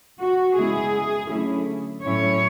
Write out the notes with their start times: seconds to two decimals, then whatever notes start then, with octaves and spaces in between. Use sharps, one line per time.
0.19 F#4
0.55 C#3 G#3 B3 E4 G#4
1.29 D3 F#3 A3 C#4 E4
2.03 A2 F#3 A3 C#4 E4 C#5